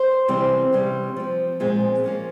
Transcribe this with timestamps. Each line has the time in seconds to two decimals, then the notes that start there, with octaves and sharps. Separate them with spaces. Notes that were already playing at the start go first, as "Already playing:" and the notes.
Already playing: C5
0.28 C3 E3 G3 C4
0.73 C3 G3 C#4
1.16 F3 C4
1.60 A#2 F3 G#3 C4
2.04 F3 A#3 C#4